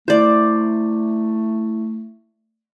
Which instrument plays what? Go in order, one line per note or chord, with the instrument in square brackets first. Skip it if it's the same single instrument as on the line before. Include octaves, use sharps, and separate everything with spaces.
[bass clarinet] A3 [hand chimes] E4 [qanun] C5 D5